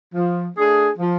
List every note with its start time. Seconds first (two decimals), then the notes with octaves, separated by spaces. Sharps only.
0.15 F3
0.56 A3 D4 G#4
0.99 F3